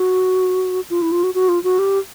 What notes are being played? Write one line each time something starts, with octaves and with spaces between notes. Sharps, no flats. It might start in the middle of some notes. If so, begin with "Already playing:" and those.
Already playing: F#4
F4
E4
F4
F#4
F#4
F4
F#4
G4